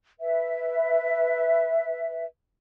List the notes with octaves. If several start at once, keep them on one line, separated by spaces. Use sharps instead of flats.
B4 E5